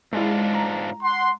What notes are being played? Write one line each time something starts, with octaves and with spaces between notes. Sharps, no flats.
G#2 G#3 D4 E4 F4
A#5
F#5 C6